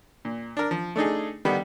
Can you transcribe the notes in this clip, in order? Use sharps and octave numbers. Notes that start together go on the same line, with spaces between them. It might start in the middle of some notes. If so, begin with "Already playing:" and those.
A#2
D4 A#4
F3
A3 D4 D#4 G#4
D3 D#3 G3 B3